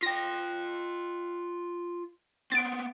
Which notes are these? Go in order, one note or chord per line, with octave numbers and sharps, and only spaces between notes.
F4 G5 A#6
B3 C4 A6 D7